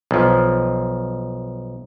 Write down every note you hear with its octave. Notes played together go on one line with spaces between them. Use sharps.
B1 F3